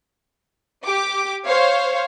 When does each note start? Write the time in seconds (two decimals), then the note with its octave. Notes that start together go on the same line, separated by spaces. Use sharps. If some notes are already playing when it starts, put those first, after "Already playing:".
0.85 G4 D6
1.45 C5 C#5 F5